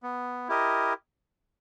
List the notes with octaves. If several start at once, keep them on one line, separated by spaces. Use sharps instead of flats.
B3
E4 G4 A#4 D#5